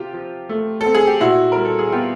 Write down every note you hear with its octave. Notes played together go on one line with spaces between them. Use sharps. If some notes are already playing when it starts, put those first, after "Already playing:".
Already playing: C3 F4 G4
F3
A3
C4 A4
G#4
G4
A#2 E4 F#4
G3 A#4
A4
G#4
B3 F4 G4